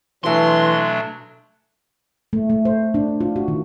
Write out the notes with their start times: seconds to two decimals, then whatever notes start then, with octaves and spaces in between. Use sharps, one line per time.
0.24 B2 E3 F#3 A3 D4 G#5 C6 D6
2.33 A3
2.50 A3
2.65 C5
2.94 D4
3.21 F4
3.36 F#4
3.48 D#3